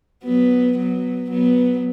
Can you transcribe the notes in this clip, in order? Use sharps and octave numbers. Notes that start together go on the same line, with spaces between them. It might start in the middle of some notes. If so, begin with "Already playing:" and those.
F#3 B3
F#3 B3
F#3 B3